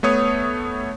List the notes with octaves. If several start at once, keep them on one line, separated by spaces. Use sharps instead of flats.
A3 B3 C#5 D#6